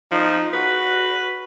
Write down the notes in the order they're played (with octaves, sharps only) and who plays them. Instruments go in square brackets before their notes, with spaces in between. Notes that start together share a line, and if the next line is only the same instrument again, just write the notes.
[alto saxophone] F3 [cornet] D#4
[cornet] F#4 [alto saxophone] B4